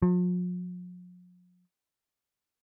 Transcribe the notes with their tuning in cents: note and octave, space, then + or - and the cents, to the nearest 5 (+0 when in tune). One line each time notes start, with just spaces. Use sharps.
F3 +45